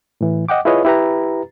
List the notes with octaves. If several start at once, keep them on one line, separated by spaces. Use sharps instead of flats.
A2 E3
D#5 F#5 G5 D6
E4 F4 G#4 B4 C#5 D#5
E4 G4 B4 A#5